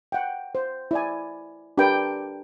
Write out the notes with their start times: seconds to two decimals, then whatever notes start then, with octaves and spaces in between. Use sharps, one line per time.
0.12 F#5 G5
0.55 C5
0.91 E4 D5 G#5
1.78 D4 G4 A#4 B4 G5